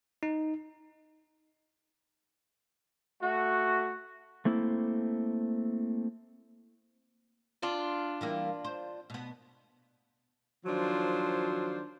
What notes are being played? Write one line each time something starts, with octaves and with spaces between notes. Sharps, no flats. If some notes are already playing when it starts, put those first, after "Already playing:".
D#4
A3 F#4
A3 A#3 C4 E4 A4
D4 F4
E3 G3 A#3
C5
B2 B3
D#3 F3 F#3 D4 F4 C5